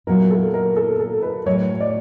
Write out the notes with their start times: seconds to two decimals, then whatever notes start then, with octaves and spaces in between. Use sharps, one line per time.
0.07 A#2 F#3 B3 E4 A#4
0.31 A4
0.54 A#4
0.76 A4
1.00 A4
1.23 B4
1.46 A2 F#3 A3 C#5
1.81 D5